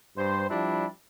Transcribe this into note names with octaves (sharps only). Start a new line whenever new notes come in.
G2 C5
F3 G3 D4 E4